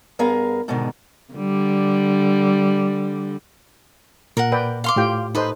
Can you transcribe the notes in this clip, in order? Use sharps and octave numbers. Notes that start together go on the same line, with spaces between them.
G2 B3 G#4 A#4 F5
G#2 B2 D3 D#3 G#3
D3 G3
A#2 A#4 F#5
B4 D5 G5
F5 C6 D6
A2 F4 G4 G5
D#4 A4 B4 C5 D#5